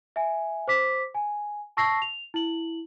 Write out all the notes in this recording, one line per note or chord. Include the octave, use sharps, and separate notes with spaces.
E5 G#5
C5 D6 B6
G#5
A5 C#6 E6 A#6 C7
F7
E4 F#7